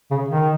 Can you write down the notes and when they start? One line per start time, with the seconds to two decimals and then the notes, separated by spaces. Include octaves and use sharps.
0.11 C#3
0.29 D#3